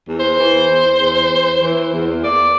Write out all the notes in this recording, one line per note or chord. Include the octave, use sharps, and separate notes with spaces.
E2
C5
E3
E2
E2
E3
E3
E2
A#3 D5